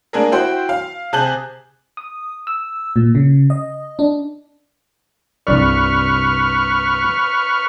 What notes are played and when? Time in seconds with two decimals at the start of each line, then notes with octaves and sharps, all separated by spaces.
0.13 G#3 A#3 D4 G#4 A#4
0.32 E4 F#4 C5 G5 C6
0.69 F5
1.13 C3 G#4 A5 F#6 G6 F#7
1.97 D#6
2.47 E6
2.96 A#2
3.15 C#3
3.50 D#5
3.99 D4
5.47 C2 G2 B4 D5 C#6 F6